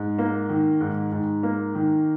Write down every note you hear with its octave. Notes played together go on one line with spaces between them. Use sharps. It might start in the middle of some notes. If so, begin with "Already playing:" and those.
Already playing: G#2
A#3
D#3
G#2
G#2
A#3
D#3